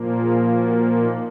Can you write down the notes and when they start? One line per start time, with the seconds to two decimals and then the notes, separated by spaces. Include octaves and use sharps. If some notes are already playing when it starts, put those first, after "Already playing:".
Already playing: A#2 F3 A#3
0.21 G#4
0.60 F#4
0.99 D#4